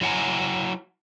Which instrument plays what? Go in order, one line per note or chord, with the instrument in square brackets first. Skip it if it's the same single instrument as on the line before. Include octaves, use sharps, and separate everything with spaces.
[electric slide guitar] F#3 E4 F#5 G#5 A#5